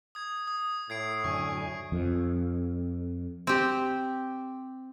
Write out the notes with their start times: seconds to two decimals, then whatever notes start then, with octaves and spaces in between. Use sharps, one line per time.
0.15 D#6 G#6
0.47 D#6
0.90 A2 G#6 C7 D7
1.24 F#2 D3 G#5 C#6
1.92 F2
3.47 C4 G4